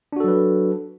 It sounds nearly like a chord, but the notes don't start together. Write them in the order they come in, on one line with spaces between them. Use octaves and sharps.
D4 F#4 A4 F#3 B4